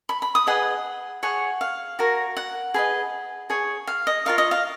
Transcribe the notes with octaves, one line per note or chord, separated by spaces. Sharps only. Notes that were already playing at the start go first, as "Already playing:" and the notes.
B5
B5
D#6
G#4 B4 D#5 F#5
G#4 C#5 F#5
F5
F#4 A#4 C#5
F#5
G#4 B4 D#5
G#4 C#5
F5
D#5
F4 A#4 C#5 F5
D#5
F5